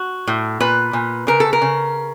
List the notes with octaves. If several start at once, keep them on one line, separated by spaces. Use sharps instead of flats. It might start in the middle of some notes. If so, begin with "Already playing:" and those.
Already playing: F#4
A2
A#2 B4
A#2
C#3 A#4
A4
A#4
C#3